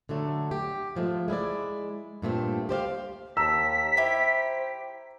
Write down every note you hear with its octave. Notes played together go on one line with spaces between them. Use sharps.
D3 F#3 A3
G4
G#2 F3 G#3 A3
G#3 E4 A#4 D5
G2 A#2 A3 C4
G4 C5 D5 F5
D#2 A5 A#5 E6 B6
E4 G4 C5